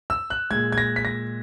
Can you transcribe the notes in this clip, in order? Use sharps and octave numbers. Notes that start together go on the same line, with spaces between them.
E6
F#6
A#2 G#3 G#6
G#6
A#6
B6
A#6